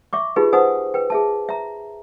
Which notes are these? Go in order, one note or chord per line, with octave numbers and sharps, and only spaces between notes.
E5 C#6 D6
D#4 F4 G4 G#4 B4
D#4 B4 C5 F#5 G#5 D#6
B4 G5
G#4 E5 A5
E5 A#5